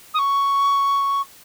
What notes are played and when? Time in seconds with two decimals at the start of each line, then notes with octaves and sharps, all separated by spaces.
0.14 D#6
0.18 C#6